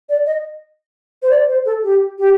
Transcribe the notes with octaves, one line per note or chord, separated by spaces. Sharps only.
D5
D#5
C5
D5
C5
A4
G4
G4